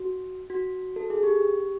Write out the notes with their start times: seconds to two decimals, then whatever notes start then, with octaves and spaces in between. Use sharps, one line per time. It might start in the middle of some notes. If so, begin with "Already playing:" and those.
Already playing: F#4
0.50 F#4
0.96 A4
1.10 G#4
1.23 G4